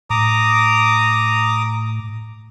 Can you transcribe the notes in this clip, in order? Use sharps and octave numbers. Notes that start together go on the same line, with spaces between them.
A2 A#5 D6 D#6